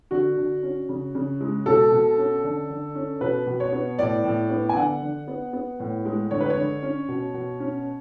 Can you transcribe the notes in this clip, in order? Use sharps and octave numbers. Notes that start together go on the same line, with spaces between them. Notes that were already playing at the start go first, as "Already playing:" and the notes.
D3 F#4
D3
C#4
C#3
C#3
G#3
B2 A4
B2
C#4
D3
D3
C#4
B2 B4
B2
C#5
B3
A2 D5
A2
B3
G#5
D3 F#5
D3
B3
B3
A2
G#3
D3 C#5
B4
C#5
D3
C#4
B2
B2
C#4